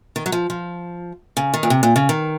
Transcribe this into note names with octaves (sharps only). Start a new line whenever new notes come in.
D#3
F#3
F3
F3
C#3
D#3
A#2
C3
A#2
C#3
D#3